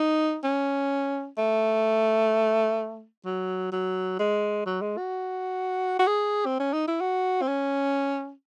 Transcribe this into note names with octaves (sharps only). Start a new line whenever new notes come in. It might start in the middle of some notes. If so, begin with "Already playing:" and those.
Already playing: D#4
C#4
A3
F#3
F#3
G#3
F#3
G#3
F#4
F#4
G#4
C4
C#4
D#4
E4
F#4
C4
C#4